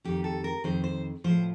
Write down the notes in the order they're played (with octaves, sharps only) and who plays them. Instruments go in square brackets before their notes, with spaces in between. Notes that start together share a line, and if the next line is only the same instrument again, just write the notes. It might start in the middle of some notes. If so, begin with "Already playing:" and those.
[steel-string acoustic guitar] F2 D#3 G4
A4
A#4
F2 D#3 C5
C5
A2 F3 C5